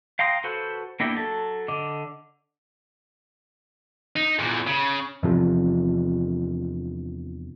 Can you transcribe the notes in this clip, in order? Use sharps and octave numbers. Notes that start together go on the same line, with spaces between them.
F5 G5 A#5 C6 D#6
F#4 A4 B4 C5
A#3 B3 D4 E4 G4
F#3 A4
D3 D#5 D6
D#4
E2 A#2
C#3
E2 C3 F3